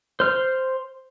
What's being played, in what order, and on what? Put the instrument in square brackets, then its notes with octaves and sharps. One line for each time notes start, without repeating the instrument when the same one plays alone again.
[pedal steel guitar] C5 F6